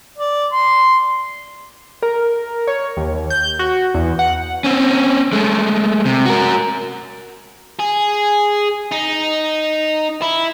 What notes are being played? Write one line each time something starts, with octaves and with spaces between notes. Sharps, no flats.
D5
C6
A#4
C#5
D#2
G6
F#4
E2
F#5
C4 C#4
G#3 A3
C3
F#4 A#4
G#4
D#4
E4